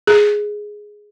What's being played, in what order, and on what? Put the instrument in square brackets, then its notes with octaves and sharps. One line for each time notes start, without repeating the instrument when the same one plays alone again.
[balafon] G#4